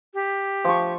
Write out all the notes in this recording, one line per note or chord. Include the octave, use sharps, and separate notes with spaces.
G4
F3 C#6